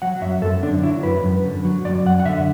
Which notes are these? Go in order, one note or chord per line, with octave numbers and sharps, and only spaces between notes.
F#3 F#5
F#2 E5
F#2 A4
D3 D4
F#3 E4
F#2 B4
F#2
D3
F#3
F#2 D5
F#2 F#5
F#5
D3 E5